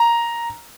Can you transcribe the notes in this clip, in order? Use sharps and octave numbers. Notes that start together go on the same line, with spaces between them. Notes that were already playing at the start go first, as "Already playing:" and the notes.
Already playing: A#5